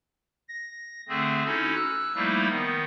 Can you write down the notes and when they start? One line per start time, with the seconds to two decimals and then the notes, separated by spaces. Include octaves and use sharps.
0.49 A#6
1.08 D3 A3 C4 G#4
1.45 C#4 D#4 E4 F#4 A4
1.75 E6 F#6
2.15 F3 G3 A3 A#3 D#4 E4
2.49 D#3 B3